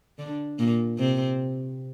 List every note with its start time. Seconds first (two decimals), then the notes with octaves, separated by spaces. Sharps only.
0.19 D3 D4
0.59 A#2 A#3
0.99 C3 C4